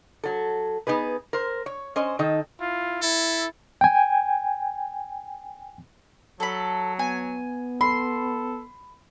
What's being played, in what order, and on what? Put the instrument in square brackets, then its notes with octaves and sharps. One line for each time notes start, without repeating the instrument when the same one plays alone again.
[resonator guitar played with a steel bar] F#3 A4
B3 D#4 G#4 B4
A#4 C5
C#5
C#4 C5 D#5
D#3 D#4 A4
[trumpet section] E4 F4
[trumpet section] E4 [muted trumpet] A4
[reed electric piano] G5 G#5
[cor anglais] F#3 [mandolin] A4 B5
[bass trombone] B3 [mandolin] G#5
[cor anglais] A4 [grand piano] B5 [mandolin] C6